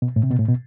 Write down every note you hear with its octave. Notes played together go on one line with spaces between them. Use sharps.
B2
A2
C3
B2
A2
B2